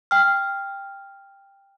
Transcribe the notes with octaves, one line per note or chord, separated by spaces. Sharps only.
G5 F6